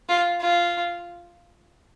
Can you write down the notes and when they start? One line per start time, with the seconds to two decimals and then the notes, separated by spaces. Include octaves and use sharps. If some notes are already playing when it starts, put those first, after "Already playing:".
0.09 F4
0.41 F4